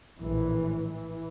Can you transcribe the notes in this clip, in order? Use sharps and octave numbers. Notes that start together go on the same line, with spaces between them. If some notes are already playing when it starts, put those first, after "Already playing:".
A#1 A2 E3
E3